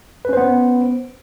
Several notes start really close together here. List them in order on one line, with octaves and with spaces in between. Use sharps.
B4 C#4 C5 B3